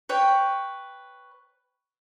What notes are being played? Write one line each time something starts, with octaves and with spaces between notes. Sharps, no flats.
B4 C#5 G5